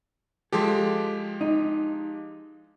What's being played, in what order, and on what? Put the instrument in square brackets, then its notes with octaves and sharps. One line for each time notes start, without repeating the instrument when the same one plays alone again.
[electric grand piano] F3 G#3 G4 [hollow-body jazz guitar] A4
[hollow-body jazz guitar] D#4